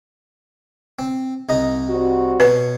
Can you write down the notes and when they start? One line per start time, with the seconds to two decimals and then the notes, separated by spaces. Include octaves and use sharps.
0.99 C4
1.49 C2 D#4 D#5
1.90 G3 C4 F#4
2.40 B2 B4 C#5 C6